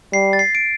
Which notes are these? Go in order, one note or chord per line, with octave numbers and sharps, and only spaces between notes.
G3 C7
A6
C7
D7